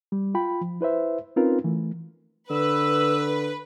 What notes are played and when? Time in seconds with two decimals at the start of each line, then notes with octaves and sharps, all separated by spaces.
0.12 G3
0.35 F4 G5 B5
0.61 F3
0.81 E4 B4 C5 E5
1.36 C4 C#4 D#4 F4 A#4 B4
1.64 E3 A3
2.51 D3 B4 E6